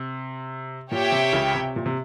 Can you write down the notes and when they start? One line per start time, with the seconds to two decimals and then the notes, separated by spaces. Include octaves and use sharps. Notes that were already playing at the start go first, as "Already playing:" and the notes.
Already playing: C3
0.91 A#2 G4 C#5 E5 G5
1.12 C3
1.33 C#2 C#3
1.55 C3
1.76 A#2
1.86 C3